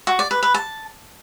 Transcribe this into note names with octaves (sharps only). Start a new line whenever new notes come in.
F#4
D5
B4
B4
A5